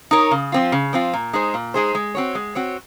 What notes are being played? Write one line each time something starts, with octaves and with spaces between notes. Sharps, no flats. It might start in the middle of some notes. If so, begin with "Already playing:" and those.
D#4 A#4 C#5
C#3
F3 C4 F4
C#3
F3 C4 F4
A#2
G#3 D#4 G#4 C5
A#2
G#3 D#4 G#4 C5
G#3
C4 F#4 C#5
G#3
C4 F#4 C#5